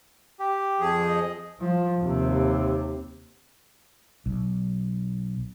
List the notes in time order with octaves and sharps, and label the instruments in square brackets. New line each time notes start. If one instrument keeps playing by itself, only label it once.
[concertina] G4
[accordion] F2 F3 G#4
[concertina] D#5
[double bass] F3
D#2 C3
[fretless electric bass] B1